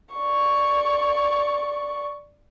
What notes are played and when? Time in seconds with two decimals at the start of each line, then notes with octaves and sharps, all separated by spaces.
0.15 D5 C#6